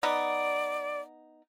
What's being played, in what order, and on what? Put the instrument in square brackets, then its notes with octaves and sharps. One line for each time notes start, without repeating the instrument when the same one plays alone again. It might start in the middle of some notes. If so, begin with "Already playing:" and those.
[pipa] B3 D#4 [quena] D5